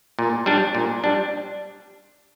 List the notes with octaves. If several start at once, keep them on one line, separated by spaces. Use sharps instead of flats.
A#2
G3 D4
A#2
G3 D4